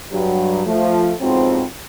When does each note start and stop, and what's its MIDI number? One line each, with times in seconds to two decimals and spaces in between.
0.12 0.61 43
0.12 0.61 54
0.66 1.12 53
0.66 1.12 57
1.20 1.63 41
1.20 1.63 44
1.20 1.63 47
1.20 1.63 53
1.20 1.63 54
1.20 1.63 60